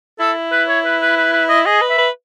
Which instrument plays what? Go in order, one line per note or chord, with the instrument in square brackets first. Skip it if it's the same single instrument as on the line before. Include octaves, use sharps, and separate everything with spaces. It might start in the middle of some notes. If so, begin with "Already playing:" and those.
[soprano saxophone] E4 [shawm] A4
[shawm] B4
C#5
B4
B4
B4
B4
D#5
[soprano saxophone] G#4 [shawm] D#5
[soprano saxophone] B4
[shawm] E5
[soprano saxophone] B4